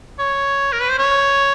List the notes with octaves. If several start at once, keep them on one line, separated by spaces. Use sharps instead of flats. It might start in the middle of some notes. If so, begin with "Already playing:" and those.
C#5
A#4
B4
C5
C#5